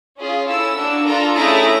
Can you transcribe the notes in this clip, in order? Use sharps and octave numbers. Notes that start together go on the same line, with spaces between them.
C#4 F4 G#4
C#4 E4 A4 E6
A#3 D4 F#4
D4 F4 A4 A#5
A3 C#4 E4 G#4 A#5